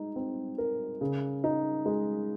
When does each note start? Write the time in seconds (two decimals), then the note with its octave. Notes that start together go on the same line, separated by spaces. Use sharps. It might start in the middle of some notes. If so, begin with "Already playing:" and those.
Already playing: G#3 D#4
0.16 C4
0.58 A#4
1.01 C#3
1.44 D#4
1.86 G#3